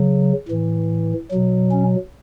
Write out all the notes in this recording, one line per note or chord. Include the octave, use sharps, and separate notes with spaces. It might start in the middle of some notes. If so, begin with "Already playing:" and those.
Already playing: C#3 F#3
A2 E3
B2 F#3
C#4